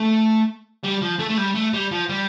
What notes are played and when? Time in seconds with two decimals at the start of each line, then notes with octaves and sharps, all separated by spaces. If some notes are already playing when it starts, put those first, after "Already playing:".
Already playing: A3
0.84 G3
1.01 F3
1.19 A3
1.29 A3
1.38 G3
1.55 A3
1.74 G3
1.91 F3
2.09 G3